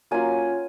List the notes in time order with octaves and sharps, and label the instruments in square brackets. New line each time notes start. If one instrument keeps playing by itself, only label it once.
[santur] F#3 A#3 C#4 F4 G#5